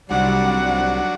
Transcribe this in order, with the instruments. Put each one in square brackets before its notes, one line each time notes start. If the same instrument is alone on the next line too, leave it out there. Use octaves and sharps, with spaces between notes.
[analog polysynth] C2 C3 [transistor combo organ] F#3 D4 F#4 [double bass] G3 [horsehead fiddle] F#5